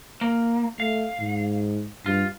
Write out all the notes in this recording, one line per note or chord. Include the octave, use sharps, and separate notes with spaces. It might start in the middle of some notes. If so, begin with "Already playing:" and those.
A#3
A3 F5
G#2
G2 F4